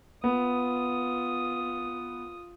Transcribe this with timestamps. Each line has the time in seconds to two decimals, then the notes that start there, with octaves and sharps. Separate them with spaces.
0.24 B3 F4 D#6